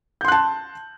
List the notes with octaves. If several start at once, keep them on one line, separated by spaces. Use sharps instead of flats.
A5 C6 F#6 G6